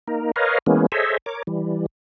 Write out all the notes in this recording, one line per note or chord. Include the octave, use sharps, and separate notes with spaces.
A#3 D#4 A#4
A#4 B4 C#5 D#5 F5
E3 G#3 A#3 B3 C#4
G#4 A4 C5 C#5 D#5 E5
A#4 C#5 D6
E3 G3